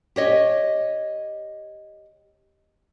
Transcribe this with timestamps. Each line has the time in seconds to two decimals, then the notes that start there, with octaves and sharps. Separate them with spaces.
0.16 G4 C#5 D#5